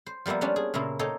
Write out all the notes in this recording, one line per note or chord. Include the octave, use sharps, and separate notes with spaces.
C5
F3 G3 A#3 B3 E4
G3 C#4 D4 F4
G#4
A#2 C#3 A#3 E4
A#3 D#4 A4 C#5 G5